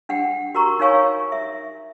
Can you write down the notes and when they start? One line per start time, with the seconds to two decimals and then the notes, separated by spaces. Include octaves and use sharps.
0.09 D4 F#5 G5
0.55 F#4 A#4 A#5 C#6
0.80 D#4 A#4 C#5 F5 G#5 C#6
1.32 E5